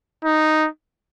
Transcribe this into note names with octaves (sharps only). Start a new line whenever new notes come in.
D#4